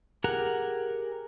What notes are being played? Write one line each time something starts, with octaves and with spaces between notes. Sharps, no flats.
G4 G#4 A#4 F#5 A#5